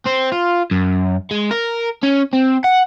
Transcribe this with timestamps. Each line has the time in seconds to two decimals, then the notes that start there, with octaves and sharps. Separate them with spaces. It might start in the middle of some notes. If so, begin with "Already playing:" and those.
0.06 C4
0.32 F4
0.71 F#2
1.31 G#3
1.51 A#4
2.03 C#4
2.33 C4
2.64 F#5